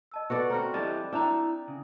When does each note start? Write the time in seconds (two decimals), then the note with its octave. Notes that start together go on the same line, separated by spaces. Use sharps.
0.12 D#5 A5 E6
0.30 B3 F#4 A4 B4 D5
0.50 C4 F#4 A#5 F6
0.74 G3 D4 E4 D#5 D6 A6
1.13 D4 E4 E5 G5 A#5
1.68 C#3